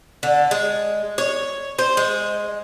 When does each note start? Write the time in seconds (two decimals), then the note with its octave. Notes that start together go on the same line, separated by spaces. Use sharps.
0.23 D3
0.51 G#3
1.18 C#5
1.79 C5
1.97 G#3